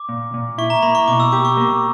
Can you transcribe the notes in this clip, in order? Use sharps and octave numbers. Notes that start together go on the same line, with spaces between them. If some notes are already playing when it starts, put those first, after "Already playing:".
Already playing: D6
A#2
A#2
E4 C#6
A#5
A#3 B5
C#6
B2 D6
E6
G4 D6
C#6
A#3